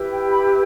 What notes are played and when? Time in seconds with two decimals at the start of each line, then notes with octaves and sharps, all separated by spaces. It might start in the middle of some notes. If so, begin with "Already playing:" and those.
Already playing: E4 G4 B4
0.12 G5
0.31 B5